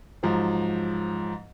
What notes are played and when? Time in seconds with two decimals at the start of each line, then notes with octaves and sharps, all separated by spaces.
0.23 G#2 F3 F#3